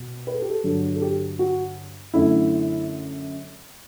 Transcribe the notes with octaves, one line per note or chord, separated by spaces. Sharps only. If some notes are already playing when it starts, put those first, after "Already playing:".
Already playing: B2
B4
A4
G4
A4
G2 D3 F#3 A4
A4
G4
F#4
F#2 D3 A3 E4